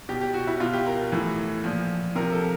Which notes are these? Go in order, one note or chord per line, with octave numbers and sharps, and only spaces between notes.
B2 G4
G4
F#4
E4
B2 F4
G4
A#4
A2 E3
A#2 F3
C3 F3 A#4
A4